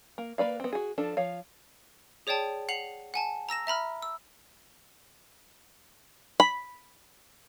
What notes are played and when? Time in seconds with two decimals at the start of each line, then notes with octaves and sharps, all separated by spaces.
0.18 A#3
0.38 A#3 B4 D5 F5
0.60 B3 C4
0.73 F#4 G#4
0.98 F3 D4 A4
1.17 F3 C#5 F5
2.27 G#4 C#5 D5 G5 A5
2.69 F#5 C7 F7 F#7
3.14 F#5 G#5 A5
3.49 A#5 E6 A#6 E7
3.67 E5 A#5 B5 F6
4.02 E6
6.40 B5